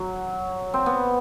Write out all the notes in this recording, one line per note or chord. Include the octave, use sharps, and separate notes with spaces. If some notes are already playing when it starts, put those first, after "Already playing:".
Already playing: F#3
C4
B3